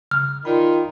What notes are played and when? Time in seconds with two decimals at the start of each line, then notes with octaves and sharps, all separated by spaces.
0.11 C#3 F6
0.45 D#3 F4 D5 B5